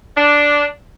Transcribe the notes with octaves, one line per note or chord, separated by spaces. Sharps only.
D4